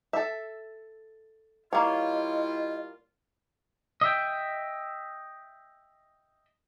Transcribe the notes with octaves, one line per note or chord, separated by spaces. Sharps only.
A4 E5
G3 A#3 E4 F4 C#5 D#5
D#5 E5 G5